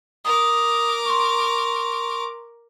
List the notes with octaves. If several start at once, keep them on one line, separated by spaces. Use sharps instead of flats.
A#4 D6 D#6
C6 C#6